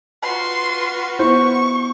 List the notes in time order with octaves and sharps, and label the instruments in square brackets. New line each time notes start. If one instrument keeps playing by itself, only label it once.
[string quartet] F4 F#4 B4 [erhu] C6
[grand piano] B3 C5 [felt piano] E4 [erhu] C#6